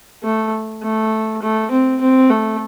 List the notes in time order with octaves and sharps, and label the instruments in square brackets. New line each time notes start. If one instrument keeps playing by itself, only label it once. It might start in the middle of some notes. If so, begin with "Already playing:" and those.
[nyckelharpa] A3
A3
A3
C4
C4
A3